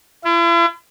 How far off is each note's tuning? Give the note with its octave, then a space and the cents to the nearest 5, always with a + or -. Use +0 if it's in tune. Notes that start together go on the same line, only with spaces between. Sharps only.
E4 +45